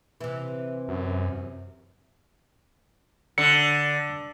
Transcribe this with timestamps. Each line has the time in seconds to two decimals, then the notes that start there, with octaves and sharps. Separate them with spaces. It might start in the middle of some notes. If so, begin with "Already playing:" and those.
0.21 C3 E3
0.89 F#2
3.38 D3 C#7